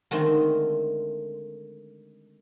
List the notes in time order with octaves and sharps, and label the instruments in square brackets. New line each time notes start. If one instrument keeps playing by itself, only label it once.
[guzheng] D3 D#3 G#3 A3 C4